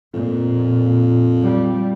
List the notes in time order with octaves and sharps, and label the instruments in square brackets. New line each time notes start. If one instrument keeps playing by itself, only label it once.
[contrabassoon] F2 [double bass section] A#2
[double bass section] G3